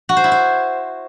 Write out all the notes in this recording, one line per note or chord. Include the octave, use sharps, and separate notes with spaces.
F#4
C5
E4
C5